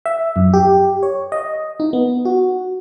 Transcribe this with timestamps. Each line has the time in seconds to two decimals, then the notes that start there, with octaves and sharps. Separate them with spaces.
0.06 E5
0.36 F#2
0.54 G4
1.03 C#5
1.32 D#5
1.80 D#4
1.93 B3
2.25 F#4